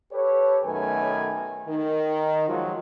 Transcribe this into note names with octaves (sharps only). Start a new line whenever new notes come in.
G4 A4 B4 C#5
B1 F#2 D#3 A3 B4 G#5
D#3
D#3 F3 F#3 G#3 F4 F#4